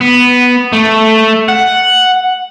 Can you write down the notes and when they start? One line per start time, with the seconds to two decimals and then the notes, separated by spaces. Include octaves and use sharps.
0.01 B3
0.73 A3
1.48 F#5